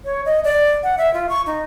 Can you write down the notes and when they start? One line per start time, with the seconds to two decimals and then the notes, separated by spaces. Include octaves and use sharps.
0.05 C#5
0.25 D#5
0.44 D5
0.83 F#5
0.98 E5
1.14 F4
1.29 C#6
1.46 D#4